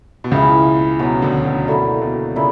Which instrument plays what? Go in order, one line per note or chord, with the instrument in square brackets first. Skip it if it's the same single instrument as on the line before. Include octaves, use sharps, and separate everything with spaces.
[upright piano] B2
[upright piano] C#2 C#3 [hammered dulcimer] E3 B3 E4
[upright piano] B2 [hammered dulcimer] F#3 C#4 F#4
[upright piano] D2 D3
D2 D3
[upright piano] B2 [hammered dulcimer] D3 A#3 E4 G4
[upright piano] B2
[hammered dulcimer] A#2 A#3 E4 [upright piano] C#3